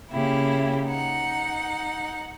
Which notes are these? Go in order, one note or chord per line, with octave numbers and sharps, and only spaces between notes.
C#3 A#3 E4 G4
D#4 F#5